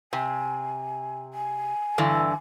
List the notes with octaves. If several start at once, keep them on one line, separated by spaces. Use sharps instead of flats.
C3 G#5
G#5
G2 D3 E3